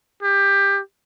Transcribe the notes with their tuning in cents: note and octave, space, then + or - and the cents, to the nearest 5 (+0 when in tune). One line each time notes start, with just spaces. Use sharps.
G4 +20